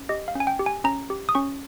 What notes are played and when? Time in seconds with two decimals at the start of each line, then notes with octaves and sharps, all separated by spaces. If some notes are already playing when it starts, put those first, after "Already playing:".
Already playing: C#4
0.09 G4 D#5
0.28 F5
0.35 C#4 G#5
0.47 G5
0.59 G4
0.66 G#5
0.84 C#4 A#5
1.10 G4
1.29 D#6
1.35 C#4 C#6